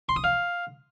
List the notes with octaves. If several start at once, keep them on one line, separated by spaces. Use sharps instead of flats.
C6
D#6
F5